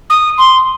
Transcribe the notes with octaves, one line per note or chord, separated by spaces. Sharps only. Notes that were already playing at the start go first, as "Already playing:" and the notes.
D#6
C6